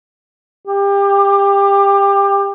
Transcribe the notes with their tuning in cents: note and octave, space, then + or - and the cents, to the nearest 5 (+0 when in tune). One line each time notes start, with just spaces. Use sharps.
G4 +25